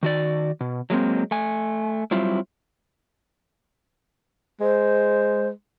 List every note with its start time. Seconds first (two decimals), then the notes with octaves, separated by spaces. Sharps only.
0.03 D#3 F#4 D5
0.61 B2
0.90 F#3 G#3 A#3 C4
1.31 A3 G#5
2.11 F#3 G3 C4 E4 F4
4.61 G#3 C5